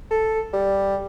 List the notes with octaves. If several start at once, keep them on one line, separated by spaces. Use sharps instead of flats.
A4
G3